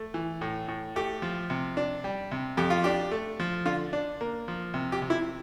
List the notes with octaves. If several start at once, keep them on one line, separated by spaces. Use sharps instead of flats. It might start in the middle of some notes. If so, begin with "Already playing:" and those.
Already playing: A3
E3
A2
A2
A3 G4
F3
C3
D4
G3
C3
F2 G4
F4
D4 G4
A3
F3
D3 F4
D4
A#3
F3
C3
G4
C3
E4